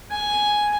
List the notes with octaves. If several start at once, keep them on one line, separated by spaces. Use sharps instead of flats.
G#5